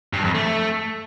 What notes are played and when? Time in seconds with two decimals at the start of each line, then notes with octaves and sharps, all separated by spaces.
0.13 G2
0.24 F2
0.35 A3